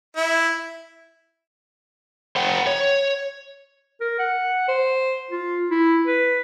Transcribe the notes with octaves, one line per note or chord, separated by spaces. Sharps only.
E4
C5 F#5 G5
C#5
A#4
F#5
C5
F4
E4
B4